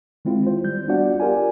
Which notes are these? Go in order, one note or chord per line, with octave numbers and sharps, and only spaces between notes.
D#3 G#3 C4 E4 F4
C5
G3 G6
B3 D4 F4 F#4 D5 F#5
F4 G4 A#4 D5 G#5